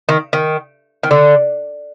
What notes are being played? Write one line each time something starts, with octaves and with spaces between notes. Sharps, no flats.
D#3
D#3
D#3
D3